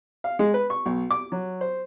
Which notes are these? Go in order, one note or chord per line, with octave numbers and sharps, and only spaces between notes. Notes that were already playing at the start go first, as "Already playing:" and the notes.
F5
G#3
B4
C#6
B1
D6
F#3
C5